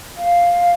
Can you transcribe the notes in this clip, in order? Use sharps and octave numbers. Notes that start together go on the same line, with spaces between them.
F5